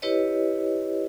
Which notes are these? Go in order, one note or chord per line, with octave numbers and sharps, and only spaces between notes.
E4 G4 B4 C#5 D#5